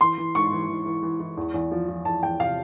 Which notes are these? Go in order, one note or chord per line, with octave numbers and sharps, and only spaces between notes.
E3 C6
E3
G#2 C#6
E3
E3
E3
E3
E3
E2
E2
F3
F3
E2 A5
E2 G5
C3 F5